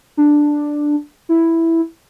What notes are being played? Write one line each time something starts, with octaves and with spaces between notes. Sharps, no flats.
D4
E4